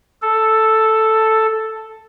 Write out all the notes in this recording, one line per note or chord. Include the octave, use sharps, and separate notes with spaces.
A4